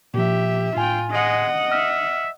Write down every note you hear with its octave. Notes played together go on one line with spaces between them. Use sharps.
A#2 F3 G4 E5
A2 F4 G5 G#5
G#3 D#5 F#5
E5 F6